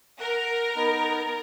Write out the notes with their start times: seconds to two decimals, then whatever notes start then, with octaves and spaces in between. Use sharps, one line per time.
0.20 A#4 F#5
0.76 B3 D#4